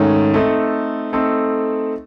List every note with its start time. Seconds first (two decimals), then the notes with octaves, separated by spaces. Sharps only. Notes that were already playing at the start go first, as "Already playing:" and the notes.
Already playing: G#2 D#3 A3 C#4
0.34 A3 C4 D#4 A4
1.13 A3 C4 D#4 A4